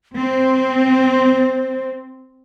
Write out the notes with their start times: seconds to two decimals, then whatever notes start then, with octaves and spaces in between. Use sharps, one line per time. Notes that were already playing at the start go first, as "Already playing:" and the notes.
0.17 C4 C5